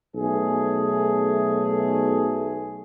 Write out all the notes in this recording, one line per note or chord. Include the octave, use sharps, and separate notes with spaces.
B1 A3 G#4